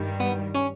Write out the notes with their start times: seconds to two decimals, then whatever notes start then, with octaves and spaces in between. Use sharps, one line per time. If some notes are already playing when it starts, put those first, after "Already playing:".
Already playing: G2 D#3 G3
0.20 B3
0.55 C#4